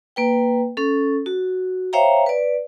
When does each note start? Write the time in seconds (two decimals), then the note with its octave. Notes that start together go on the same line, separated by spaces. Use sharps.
0.16 A#3 B4 G5
0.77 C#4 A4
1.26 F#4
1.93 C5 C#5 E5 F5 G5 A#5
2.26 B4 D5